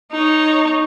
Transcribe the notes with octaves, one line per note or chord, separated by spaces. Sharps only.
D#4 C#5